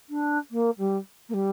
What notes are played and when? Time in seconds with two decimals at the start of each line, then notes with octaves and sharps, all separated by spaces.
0.10 D4
0.51 A#3
0.78 G3
1.29 A#3
1.34 G3